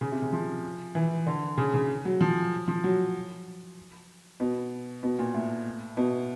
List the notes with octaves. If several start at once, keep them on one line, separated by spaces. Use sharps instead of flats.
C#3
C3
C#3
F3
E3
D3
C#3
C#3
F#3
F3
F3
F#3
B2
B2
A#2
A2
B2